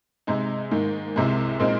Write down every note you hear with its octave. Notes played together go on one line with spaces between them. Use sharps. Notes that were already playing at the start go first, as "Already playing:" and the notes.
C3 G#3 D#4
G#2 D#3 A#3
C2 C3 G#3
A#2 G#3 C4 D#4